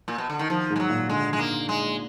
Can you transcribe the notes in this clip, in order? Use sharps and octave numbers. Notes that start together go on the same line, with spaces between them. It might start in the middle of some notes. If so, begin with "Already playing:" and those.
A#2
B2
D3
D#3
D#3 F3
G#2
G#3
F#3
A#2
D3 G#3
G#3
A#3
G#3